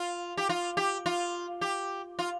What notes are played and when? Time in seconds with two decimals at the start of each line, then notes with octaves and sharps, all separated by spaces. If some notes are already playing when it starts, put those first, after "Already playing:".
Already playing: F4
0.37 G4
0.49 F4
0.77 G4
1.06 F4
1.61 G4
2.19 F4